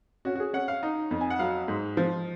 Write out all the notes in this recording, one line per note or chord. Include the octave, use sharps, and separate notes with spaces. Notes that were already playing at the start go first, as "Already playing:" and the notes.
C#4 F#4
F#4
G#4
C#4 F#5
F5
D#4
F2
G#5
F#5
F#3 F5
G#2
F3